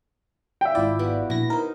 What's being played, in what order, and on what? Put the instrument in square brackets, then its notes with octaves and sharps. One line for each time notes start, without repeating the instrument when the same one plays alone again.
[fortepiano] E5 G5
[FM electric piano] G#1 F4 D5 [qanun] E4
[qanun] B3 F#4 G4
[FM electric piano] A#1 A#6 [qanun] E4
[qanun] D#4 C5 [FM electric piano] A#4